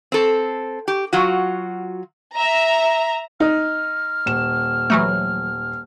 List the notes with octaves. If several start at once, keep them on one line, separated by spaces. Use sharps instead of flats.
C4 A4
G4
F#3 F4 F#4
E5 A#5
D#4 F6
D#1 E7
E3 F#3 A3